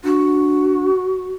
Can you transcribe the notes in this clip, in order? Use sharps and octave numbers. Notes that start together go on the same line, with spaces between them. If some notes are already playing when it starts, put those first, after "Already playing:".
D4 F#4